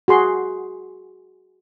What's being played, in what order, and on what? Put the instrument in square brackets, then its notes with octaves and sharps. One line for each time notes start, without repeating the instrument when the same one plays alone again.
[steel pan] F#4 G#4 C6